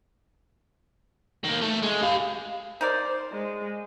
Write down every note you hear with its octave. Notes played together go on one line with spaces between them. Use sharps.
D#3 A#3
A3
G#3
G4 F5
D#4 A#4 C5 D5
G#3